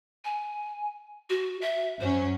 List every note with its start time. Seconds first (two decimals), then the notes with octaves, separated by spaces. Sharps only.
0.25 G#5
1.30 F#4
1.61 E5
2.01 F#2 F#3 C#4 C5